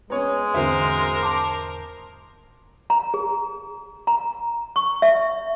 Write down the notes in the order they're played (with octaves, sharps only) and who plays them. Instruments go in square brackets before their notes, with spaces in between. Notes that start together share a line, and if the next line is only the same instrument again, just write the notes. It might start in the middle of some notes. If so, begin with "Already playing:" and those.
[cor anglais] G#3 [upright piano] B3 C#5 [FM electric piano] C#4 A#5
[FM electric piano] E2 G#2 D3 [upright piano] C4 F#4 E5 [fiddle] A#4 C5
[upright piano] A5 C6 D6
[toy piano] A#5
G#4
A#5
C#6
E5